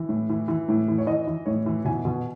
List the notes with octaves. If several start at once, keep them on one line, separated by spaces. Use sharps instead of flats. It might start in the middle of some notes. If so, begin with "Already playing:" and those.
Already playing: E3
A2
E3
E3
A2
E3
C#5
E3 D#5
E3
A2 C#5
E3
B2 G#5
B2